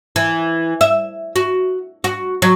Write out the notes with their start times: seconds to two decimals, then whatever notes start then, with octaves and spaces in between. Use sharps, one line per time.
0.16 E3
0.81 E5
1.36 F#4
2.04 F#4
2.42 F#3